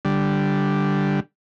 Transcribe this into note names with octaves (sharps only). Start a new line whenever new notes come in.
D3 G3